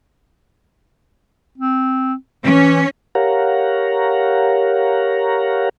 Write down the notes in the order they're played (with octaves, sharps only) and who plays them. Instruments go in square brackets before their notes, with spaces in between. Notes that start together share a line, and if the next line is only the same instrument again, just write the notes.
[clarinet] C4
[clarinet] E3 [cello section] C#4
[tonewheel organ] G4 A#4 C#5 F5 F#5 A#5